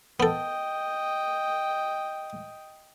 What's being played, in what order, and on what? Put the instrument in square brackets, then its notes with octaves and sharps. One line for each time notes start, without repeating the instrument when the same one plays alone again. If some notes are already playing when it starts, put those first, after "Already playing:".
[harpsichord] B3 A4 [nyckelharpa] D#5 G5